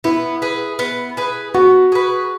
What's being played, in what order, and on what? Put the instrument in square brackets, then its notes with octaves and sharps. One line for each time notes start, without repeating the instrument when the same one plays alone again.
[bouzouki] B3 [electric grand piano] E4
[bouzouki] G#4 B4
B3
G#4 B4
[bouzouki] B3 [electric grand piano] F#4
[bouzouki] G#4 B4